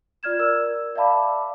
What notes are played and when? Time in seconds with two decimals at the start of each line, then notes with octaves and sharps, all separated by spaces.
0.23 F4 D5 F6 G#6 E7
0.39 A#4 D5 E6
0.96 D5 E5 F5 A5 B5 D6